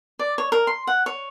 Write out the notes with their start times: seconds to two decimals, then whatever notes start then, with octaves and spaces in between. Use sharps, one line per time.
0.19 D5
0.38 C#5
0.52 A#4
0.67 C6
0.87 F#5
1.06 C#5